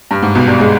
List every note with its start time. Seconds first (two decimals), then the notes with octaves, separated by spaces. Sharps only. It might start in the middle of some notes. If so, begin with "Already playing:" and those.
0.11 G2
0.22 G#2
0.35 B1 B2
0.48 G2 G3
0.60 G#3